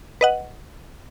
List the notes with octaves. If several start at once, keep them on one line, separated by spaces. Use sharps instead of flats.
B4 D#5 F#5